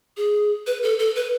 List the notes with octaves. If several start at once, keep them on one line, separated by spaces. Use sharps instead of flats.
G#4
B4
A4
A4
B4